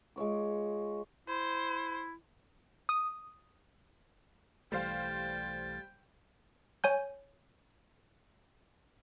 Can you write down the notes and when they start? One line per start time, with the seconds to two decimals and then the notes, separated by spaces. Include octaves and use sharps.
0.16 G#3 F4 C#5 D6
1.28 E4 C5
2.89 D#6
4.72 B1 E3 G3 A3 C5 F5 G5 A6
6.84 C#5 G#5 G6